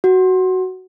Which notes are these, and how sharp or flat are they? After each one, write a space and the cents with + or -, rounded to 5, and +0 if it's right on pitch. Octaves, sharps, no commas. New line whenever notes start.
F#4 +10